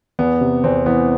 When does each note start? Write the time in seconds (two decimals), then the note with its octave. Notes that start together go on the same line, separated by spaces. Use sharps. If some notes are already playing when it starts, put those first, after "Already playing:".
0.19 E2 B3
0.41 C3
0.64 E2 C4
0.86 E3 B3